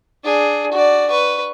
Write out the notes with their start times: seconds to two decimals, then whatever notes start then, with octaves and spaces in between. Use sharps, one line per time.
0.23 D4 G#4
0.72 F#4 D5
1.11 B4 C#6